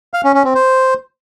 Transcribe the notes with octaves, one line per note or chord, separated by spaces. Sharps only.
F5
C#4
C#4
C4
C5